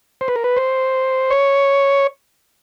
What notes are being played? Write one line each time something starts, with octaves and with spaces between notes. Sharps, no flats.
C5
B4
A#4
B4
C5
C#5